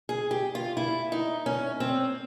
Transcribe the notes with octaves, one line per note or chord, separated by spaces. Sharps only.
G#4
G4
F4
E4
D#4
C#4
C4